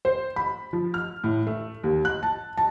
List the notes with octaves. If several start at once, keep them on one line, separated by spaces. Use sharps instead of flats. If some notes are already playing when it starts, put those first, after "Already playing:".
C5
B5
F3
F6
A2
A3
D#2
F#6
A5
A5